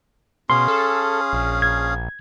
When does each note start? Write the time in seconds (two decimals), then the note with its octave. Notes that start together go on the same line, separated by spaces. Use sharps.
0.50 B2 C#4 G#4 F5 C6
0.68 A4
1.33 A#1
1.62 G#6